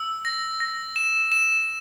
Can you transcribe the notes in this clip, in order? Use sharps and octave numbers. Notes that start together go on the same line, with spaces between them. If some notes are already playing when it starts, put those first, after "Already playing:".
Already playing: E6
A#6
A#6
E7
E7